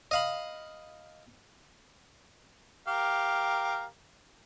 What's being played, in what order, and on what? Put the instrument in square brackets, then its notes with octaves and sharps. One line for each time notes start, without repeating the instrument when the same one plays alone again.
[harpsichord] D#5 F5 B5
[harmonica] G4 A#4 F5